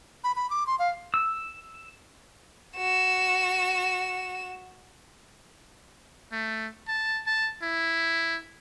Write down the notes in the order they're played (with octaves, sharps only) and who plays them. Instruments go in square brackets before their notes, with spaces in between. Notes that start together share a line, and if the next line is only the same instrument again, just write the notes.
[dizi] B5
B5
D6
C6
F5
[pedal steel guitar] E6
[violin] F#4 E7
[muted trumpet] A3
A5
A5
E4